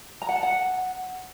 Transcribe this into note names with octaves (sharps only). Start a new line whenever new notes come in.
A#5
F#5
A5
F#5